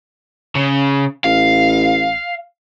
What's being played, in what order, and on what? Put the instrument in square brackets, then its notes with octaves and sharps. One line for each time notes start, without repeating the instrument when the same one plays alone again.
[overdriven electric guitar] C#3
[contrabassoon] A1 [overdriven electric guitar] F5